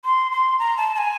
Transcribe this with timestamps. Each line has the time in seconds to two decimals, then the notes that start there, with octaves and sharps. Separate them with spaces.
0.05 C6
0.32 C6
0.59 A#5
0.77 A5
0.95 A5
0.98 G#5